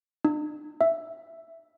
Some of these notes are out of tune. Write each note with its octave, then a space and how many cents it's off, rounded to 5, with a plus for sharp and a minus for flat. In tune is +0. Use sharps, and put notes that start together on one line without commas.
D4 +45
E5 +0